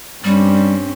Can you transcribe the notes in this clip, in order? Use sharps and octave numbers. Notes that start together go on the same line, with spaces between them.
G2 G3 C4 C#4